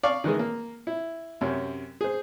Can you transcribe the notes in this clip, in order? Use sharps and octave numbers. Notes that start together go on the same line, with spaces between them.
D5 F5 C#6 D6
D#3 E3 G#3 G#4
A#3
E4
F#2 C3 C#4
G#4 C5